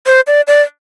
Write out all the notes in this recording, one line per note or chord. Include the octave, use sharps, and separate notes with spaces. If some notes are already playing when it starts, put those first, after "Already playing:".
C5
D5
D5